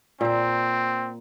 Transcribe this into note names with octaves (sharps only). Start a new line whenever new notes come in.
A#2 C4 C5